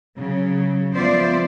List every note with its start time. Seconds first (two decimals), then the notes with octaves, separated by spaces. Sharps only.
0.17 C#3 F#3
0.96 F3 B3 F4 C5 D5 E5